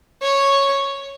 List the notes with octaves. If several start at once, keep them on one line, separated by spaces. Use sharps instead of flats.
C#5